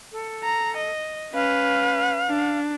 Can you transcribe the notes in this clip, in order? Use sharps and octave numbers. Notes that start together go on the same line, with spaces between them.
A4
A#5
D#5
C#4 B4 F5
D4